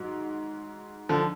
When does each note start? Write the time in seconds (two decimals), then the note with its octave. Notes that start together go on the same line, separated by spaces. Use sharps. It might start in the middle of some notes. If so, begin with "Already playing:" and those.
Already playing: G#2 F#3
1.09 D3 F3